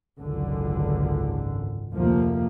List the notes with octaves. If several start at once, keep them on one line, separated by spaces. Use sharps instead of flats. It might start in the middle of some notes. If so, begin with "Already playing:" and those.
G#1 C#2 F#2 D3
F1 D2 F3 A#3